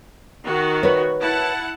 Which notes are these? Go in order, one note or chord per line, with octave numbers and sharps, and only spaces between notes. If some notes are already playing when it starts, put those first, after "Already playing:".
D#3 F#4
B4 C#5
E4 F#5 A5